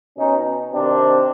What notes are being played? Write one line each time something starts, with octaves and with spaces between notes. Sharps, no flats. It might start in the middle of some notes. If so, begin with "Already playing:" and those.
B2 C#4 D#4
C3 D#3 C4 D4